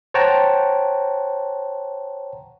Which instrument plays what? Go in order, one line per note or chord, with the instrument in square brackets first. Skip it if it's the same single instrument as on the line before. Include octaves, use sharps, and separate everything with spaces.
[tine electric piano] C5 C#5 F#5 G5 A5 A#5